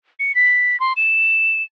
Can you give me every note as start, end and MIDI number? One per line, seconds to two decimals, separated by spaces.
0.19 0.35 97
0.35 0.79 95
0.80 0.93 84
0.96 1.62 100